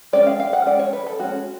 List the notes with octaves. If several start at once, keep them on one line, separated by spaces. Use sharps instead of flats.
G#3 C#4 D5
F5
F5
F#5
G#3 C#4 D5
C#5
B4
A4
G#3 C#4 F#4